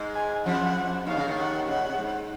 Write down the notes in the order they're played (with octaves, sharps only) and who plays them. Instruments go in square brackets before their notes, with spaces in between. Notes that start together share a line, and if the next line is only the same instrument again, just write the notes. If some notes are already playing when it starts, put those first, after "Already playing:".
Already playing: [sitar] G#2 G#3
[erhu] G#5
[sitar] F2 F3 [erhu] F#5
[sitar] D#2 D#3 [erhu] F5
[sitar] C#3
D#2 D#3
[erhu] F#5
[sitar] C#3 [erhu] F#5
[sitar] A#2
C3
G#2